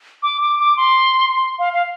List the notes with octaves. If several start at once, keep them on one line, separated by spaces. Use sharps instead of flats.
D6
D6
D6
C6
C6
F5
F5